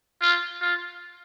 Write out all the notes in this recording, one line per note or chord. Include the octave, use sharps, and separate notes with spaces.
F4
F4